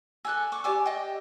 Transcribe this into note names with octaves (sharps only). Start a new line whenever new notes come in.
A4 D5 G#5 E6 F#6
C#6 D6
G4 D5 G#5 D6 E6
D#5 G5